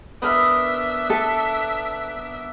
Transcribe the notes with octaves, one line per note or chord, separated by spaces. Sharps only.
B3 D4 A#4 E5
A4